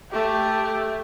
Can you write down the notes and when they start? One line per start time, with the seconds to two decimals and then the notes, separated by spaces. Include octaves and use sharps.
0.11 A3 G4